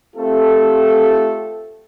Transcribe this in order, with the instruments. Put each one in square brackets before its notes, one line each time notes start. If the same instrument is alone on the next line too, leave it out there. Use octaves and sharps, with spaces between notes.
[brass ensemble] A3 C4 F4 G4 A4